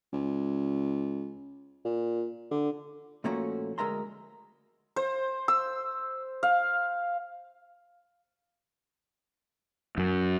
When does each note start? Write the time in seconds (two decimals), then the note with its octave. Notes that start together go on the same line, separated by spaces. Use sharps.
0.13 C#2
1.85 A#2
2.51 D3
3.24 A#2 F3 A3 A#3 C#4 F#4
3.78 D2 G#3 A#4 E5 A#5 C6
4.96 C5
5.48 E6
6.43 F5
9.98 F#2